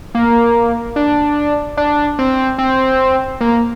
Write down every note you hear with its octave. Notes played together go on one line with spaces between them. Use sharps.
A#3
D4
D4
C4
C4
A#3